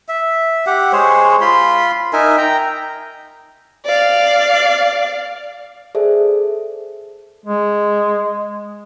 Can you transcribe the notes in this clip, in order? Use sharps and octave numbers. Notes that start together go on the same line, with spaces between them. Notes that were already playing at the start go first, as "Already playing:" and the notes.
E5
G4 F#5
G#3 G#4 C5 C#5
F4 B5 C6
D#4 A#4 E5 G#5
G5 A#5
D5 F5
G#4 A4 C5 D5 E5
G#3